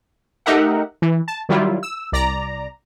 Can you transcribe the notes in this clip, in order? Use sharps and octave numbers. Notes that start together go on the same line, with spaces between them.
A3 D#4 G4 A#4 E5 F#5
E3
A5
D#3 F#3 G3 E4 F4
E6
C2 D5 A#5